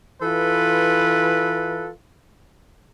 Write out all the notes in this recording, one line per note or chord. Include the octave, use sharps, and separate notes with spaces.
E3 F4 A4 B4